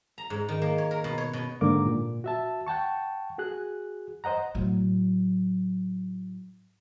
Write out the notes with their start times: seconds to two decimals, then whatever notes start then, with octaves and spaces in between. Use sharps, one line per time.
0.18 A#5
0.30 G#2
0.49 D#3
0.62 A#3
0.78 C#5
0.91 A#4
1.04 B2
1.18 C#5
1.33 B2
1.61 G#2 D3 A#3 A#4 D6
1.86 A#2
2.24 F#4 E5 A5
2.67 F#5 G5 A5 C#6
3.38 F#4 G#4 F#6
4.24 C5 D#5 F#5 A#5
4.55 A2 F#3